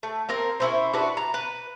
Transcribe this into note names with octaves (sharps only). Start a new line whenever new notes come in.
A3
A#3 C4 A#4
C#4 E4 C5
D4 F#4 B4
A#5
B4